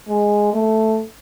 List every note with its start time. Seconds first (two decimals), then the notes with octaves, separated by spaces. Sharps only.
0.09 G#3
0.53 A3